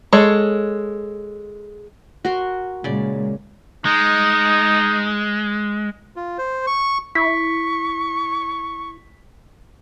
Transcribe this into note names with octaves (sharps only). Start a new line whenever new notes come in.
G#3 A4 C#5
F#4 A#4 C6
A#2 C#3 G#3 D5
G#3 D#4
F4
C5
C#6
E4 C#6 B6